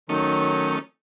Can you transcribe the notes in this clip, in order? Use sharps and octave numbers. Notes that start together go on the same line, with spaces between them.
D#3 F#3 A3 C#4 D#4